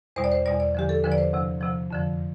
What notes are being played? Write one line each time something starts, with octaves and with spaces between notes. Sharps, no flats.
E2 B2 G3 C5
D5
C5
E2 B2 G3 D5
D5
E2 D3 F3 G4
A4
E2 D3 F3 B4
D5
C5
D2 C3 F3
D2 C3 F3
F2 D3 F3